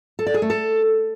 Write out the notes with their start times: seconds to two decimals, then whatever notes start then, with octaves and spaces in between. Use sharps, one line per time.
0.19 A4
0.27 D5
0.34 G#4
0.42 A3
0.50 A4